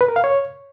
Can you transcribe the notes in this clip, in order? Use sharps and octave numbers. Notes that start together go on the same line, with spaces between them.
B4
A#4
F5
C#5